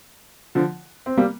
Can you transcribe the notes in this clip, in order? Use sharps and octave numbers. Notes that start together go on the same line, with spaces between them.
D3 F3
C4
G3 A#3